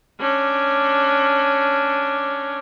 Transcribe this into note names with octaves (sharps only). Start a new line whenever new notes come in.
C#4 D4